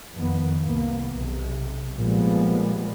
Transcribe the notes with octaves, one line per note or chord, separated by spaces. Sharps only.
F2 D#3 B3
C2 A#3 B3
B1 C3
A#2 F3 G3 G#3 B3